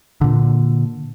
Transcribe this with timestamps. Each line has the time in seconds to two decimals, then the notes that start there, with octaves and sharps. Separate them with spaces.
0.21 A#2 D3